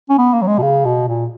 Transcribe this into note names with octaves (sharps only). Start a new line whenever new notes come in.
C#4
B3
A#3
F#3
G#3
B2
C#3
B2
A#2